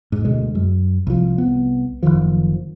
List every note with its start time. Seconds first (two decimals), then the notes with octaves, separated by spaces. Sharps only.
0.12 G#2
0.25 D2 B2 G#3
0.55 F#2
1.07 C2 F3
1.38 C2 B3
2.03 F#1 B1 D#3 F3